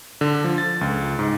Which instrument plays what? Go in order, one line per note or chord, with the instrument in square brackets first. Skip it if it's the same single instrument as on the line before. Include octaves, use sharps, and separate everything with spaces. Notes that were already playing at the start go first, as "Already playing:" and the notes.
[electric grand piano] D3
F3
A6
C#2
G#2